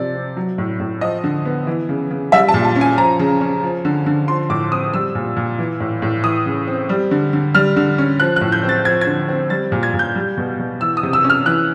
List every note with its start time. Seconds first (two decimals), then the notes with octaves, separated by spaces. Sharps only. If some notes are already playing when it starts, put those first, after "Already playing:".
Already playing: C3 F3 D5
0.15 C4
0.37 F#3
0.58 A2
0.80 A2
1.01 F3 D#5
1.24 D3
1.45 B3
1.67 E3
1.89 C#3
2.11 C#3
2.32 G3 E5
2.49 A5
2.54 A#2
2.65 A5
2.76 C#4
2.81 G#5
2.97 F3 A#5
3.19 C#3
3.41 C#4
3.63 F3
3.85 D3
4.06 D3
4.28 F3 C6
4.49 A2 D6
4.72 C4 D#6
4.93 G3 E6
5.15 A#2
5.36 A#2
5.58 E3
5.80 A2
6.02 A2
6.24 E3 D#6
6.46 C#3
6.67 C4
6.89 G3
7.11 D3
7.33 D3
7.55 G3 F6
7.76 D3
7.98 C#4
8.20 F3 F#6
8.36 F#6
8.41 A2
8.52 G6
8.63 C4
8.69 A6
8.85 F3 G#6
9.01 G#6
9.07 D3
9.29 C4
9.50 G3 A6
9.72 A#2
9.83 G#6
9.94 A#2
9.99 G6
10.15 G3
10.37 B2
10.59 B2
10.81 E3 E6
10.97 D#6
11.03 C3
11.13 E6
11.24 C#4
11.30 F6
11.46 E3 F#6